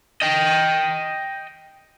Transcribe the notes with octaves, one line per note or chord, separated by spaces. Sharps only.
D#5 G5